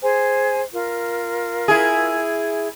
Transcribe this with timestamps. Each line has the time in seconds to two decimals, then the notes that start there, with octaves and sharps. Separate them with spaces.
0.03 G#4 C5 G#5
0.73 F4 A#4
1.68 E4 G#4